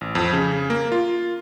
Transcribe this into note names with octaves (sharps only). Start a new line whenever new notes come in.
A1
F2
C#3
A#3
F4